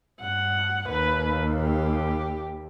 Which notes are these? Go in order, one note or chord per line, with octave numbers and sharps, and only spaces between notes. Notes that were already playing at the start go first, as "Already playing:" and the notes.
G2 F#5
D#2 B4
G4